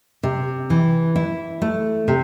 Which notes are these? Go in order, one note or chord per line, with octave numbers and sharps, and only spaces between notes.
C3
E3
E4
A3
C3